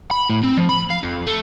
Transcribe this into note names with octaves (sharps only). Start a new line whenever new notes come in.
B5
A2
C4
F3
B5
F5
F2
A3